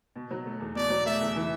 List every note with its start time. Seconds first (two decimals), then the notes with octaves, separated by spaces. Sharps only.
0.16 B2
0.31 F#3
0.46 A3
0.60 E2
0.75 B2 D5
0.90 F#3
1.06 A3 E5
1.21 E2
1.36 E3